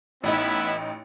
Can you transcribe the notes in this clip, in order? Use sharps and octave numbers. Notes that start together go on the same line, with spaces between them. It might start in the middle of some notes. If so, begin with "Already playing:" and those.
A1 B3 D#4 E4